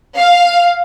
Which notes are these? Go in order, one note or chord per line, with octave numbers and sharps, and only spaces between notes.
F5